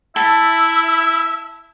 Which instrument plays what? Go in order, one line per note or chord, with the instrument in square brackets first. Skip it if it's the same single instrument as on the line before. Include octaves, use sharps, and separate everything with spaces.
[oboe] E4 [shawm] E5 [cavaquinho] A5